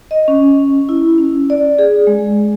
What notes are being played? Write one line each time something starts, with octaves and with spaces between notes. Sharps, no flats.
D#5
C#4
E4
C#4
D5
G#4
G#3